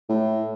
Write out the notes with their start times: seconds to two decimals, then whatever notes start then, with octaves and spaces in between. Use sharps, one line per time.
0.09 A2